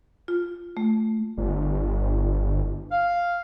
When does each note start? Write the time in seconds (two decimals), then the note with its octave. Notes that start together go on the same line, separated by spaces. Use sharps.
0.28 F4
0.77 A3
1.37 G1
2.92 F5